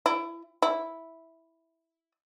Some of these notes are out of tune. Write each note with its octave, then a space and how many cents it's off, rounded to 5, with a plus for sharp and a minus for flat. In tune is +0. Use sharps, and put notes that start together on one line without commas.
E4 +25
E4 -5